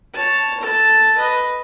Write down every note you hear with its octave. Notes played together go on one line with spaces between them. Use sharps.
C#5 A5
A4 A5
B4 D#5